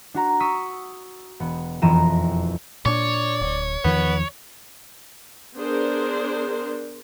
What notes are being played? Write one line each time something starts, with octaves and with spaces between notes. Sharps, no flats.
D4 F#4 A#5
C#6 D#6 E6 B6
E1 B3
E1 F2 E3 A#5 D#7 E7
A#2 D4 C#5 D5
D1
E2 D#3 F3 B3
B3 D4 G#4 A#4 C5